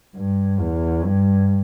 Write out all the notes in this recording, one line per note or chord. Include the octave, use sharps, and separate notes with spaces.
G2
E2
G2